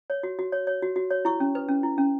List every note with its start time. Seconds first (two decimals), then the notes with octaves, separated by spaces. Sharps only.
0.10 C#5
0.23 F#4
0.39 F#4
0.52 C#5
0.67 C#5
0.82 F#4
0.96 F#4
1.10 C#5
1.25 E4 C#6
1.40 C#4
1.55 B4
1.69 C#4
1.83 E4
1.98 C#4